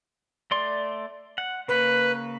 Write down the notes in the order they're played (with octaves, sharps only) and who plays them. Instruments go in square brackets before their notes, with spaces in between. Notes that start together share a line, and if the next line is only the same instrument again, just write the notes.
[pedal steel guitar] A3 D5 C6
F#5
[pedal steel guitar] C#3 A#3 [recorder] B4